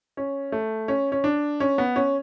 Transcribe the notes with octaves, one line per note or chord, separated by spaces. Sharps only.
C#4
A3
C#4
C#4
D4
C#4
B3
C#4